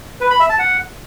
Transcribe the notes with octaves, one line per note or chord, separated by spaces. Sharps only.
B4
B5
E5
A5
F#5